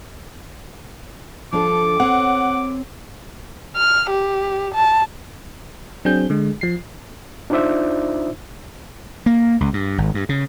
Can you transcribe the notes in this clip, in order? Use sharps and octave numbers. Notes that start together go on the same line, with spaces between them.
F3 D4 A4 D6
C4 C#5 F#5
F6
G4
A5
F#3 C4 D4 G#4 G6
D3 G#3
F3 C7
D4 D#4 F4 C5 D5 E5
A#3
C#2
G2
G#1
G2
C#3